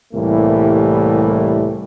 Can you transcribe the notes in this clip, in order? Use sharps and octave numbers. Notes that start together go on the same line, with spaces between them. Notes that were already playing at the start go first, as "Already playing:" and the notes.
C2 A2 E3 G3 A#3